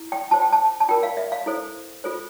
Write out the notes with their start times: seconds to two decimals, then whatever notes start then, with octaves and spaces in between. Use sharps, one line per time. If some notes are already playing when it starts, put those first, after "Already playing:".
Already playing: E4
0.12 G5
0.31 F4 C5 A5
0.42 G5
0.52 A5
0.80 A5
0.89 F4 A#4 G5
1.03 F5
1.17 E5
1.32 F5
1.46 E4 A4 C5
2.04 F4 A4 C5